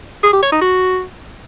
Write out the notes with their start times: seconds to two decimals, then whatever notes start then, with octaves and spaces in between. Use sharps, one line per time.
0.23 G#4
0.33 G4
0.42 C#5
0.52 D#4
0.61 F#4